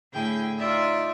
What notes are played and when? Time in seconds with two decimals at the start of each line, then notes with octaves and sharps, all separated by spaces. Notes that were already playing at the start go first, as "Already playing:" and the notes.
0.13 A2 D3 E4 G#4 G5
0.58 D#4 F4 D5 E5